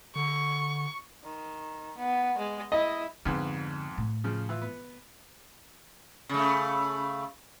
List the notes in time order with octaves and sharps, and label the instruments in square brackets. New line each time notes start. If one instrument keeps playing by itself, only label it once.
[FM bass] D3 [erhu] C#6
[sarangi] D#3
B3
G#3
[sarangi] E4 [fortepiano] D#5
[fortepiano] F2 G#2 B3 [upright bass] D3
[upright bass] A2
[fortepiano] C#3 F3
E3 F4 B4
B3
[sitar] C#3 A3